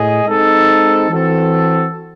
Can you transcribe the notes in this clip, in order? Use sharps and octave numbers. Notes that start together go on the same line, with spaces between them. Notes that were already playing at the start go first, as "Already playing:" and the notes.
Already playing: A2 G#4 D#5
G#3 C4 D#4 A4
E3 C4 F#4 A4